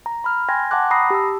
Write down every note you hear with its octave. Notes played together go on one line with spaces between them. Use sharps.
A#5
B5 F6
G5 G#5 C6 G#6 A#6
F#5 G5 A5 C6 D6 F#6
A#5 B5 D#6 A#6 C7
G4 A5 E6